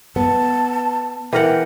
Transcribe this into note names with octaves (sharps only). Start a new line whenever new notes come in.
B3 A5
E3 A#4 F#5 G5